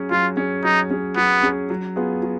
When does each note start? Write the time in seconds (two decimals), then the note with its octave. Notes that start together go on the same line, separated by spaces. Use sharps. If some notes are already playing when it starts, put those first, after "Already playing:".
Already playing: F#3 C#4 G#4
0.11 F#3 F4
0.37 C#4 G#4
0.64 F#3 D#4
0.91 C#4 G#4
1.16 F#3 B3
1.43 C#4 G#4
1.70 F#3
1.96 B3 F4 G#4
2.23 F#3